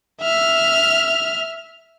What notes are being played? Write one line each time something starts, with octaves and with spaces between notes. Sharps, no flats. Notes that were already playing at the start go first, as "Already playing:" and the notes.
E5 F6